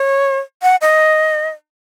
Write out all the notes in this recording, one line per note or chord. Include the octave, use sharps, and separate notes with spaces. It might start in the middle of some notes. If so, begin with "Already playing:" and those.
Already playing: C#5
F#5
D#5